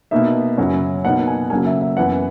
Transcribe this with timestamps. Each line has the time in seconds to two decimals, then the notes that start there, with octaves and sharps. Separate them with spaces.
0.11 B2 A#3 D#4 E5
0.58 F#2 C#3 F#3 C#4 E4
1.05 B2 A#3 D#4 F#5
1.27 G#5
1.50 C#3 F#3 A#3 G#5
1.66 E5
1.81 E5
1.97 F#2 E3 B3 F#5